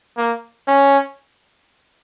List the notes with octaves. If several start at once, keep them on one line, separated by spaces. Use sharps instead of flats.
A#3
C#4